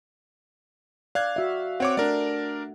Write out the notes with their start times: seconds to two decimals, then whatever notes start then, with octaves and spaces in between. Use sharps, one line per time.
1.15 D5 F5 F#6 G#6
1.36 F#4 E5
1.80 C4 C#5 F#5 D6
1.97 A3 D4 A#4 D5